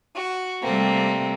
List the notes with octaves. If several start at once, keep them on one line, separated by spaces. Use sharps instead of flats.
F#4
C3 G3 A3 A#3 C4